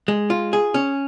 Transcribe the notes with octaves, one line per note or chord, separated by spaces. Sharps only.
G#3
F4
G#4
C#4